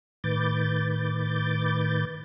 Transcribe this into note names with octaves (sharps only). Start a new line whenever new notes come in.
A2 D#3 B4 D6 G6 A6